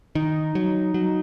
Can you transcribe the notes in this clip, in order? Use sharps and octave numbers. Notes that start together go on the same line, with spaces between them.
D#3 D#4
F#3
F#3